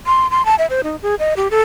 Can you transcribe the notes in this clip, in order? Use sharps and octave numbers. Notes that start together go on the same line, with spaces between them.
C6
C6
A5
E5
C5
D#4
G#4
D#5
G4
A4